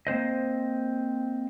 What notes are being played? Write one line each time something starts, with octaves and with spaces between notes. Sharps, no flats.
A#3 C4 C5 D#5